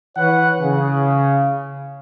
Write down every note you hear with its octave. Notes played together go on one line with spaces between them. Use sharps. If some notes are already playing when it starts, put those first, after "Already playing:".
E3 B4 C#5 F#5
C#3